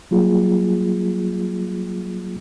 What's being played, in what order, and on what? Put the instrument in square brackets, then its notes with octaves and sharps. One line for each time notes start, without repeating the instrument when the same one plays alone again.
[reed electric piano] F#3 G3 A#3 F4 G#4